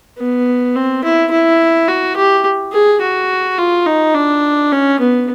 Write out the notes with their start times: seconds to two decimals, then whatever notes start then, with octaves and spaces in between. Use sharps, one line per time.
0.18 B3
0.75 C4
1.03 E4
1.31 E4
1.88 F#4
2.16 G4
2.72 G#4
3.01 F#4
3.58 F4
3.86 D#4
4.14 D4
4.72 C#4
5.00 B3